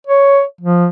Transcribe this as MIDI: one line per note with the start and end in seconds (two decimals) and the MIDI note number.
0.07 0.43 73
0.61 0.88 53